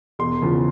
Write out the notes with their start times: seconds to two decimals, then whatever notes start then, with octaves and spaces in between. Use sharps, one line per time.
0.19 E1 C6
0.42 E2 C#3 F3